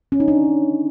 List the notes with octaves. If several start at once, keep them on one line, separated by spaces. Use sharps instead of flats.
C#4
D#4
D4